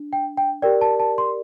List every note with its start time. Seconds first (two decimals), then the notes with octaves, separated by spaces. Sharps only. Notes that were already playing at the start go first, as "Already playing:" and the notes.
Already playing: D4
0.13 G5
0.37 G5
0.62 G4 A#4 D5 G5
0.81 A5
1.00 A5
1.18 C6